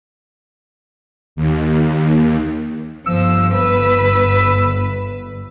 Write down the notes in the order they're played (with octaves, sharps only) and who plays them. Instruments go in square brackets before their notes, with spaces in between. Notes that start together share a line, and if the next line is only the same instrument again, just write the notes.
[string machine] D#2
[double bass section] G1 [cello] F3 [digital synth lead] E6
[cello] B4